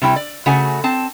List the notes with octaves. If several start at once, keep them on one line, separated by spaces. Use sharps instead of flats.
C3 G3 E4 G5
D5
C#3 A3 F#4 F#5 G#5
C4 A5